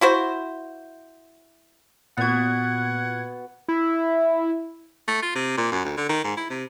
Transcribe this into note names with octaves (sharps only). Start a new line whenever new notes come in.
E4 F#4 C5
A#2 B3 F#4 F#5 G#6
E4
A3
F4
C3
A#2
F#2
D2
D3
D#3
G#2
E4
C3